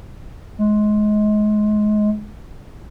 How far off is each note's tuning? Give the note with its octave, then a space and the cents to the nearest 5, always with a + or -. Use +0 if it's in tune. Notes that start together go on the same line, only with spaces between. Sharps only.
G#3 +25